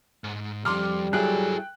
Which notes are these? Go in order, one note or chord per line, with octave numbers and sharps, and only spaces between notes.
G#2
B1 F2 G3 C6 D6 F6
G2 F#3 E4 G#4 A4 G5 F#6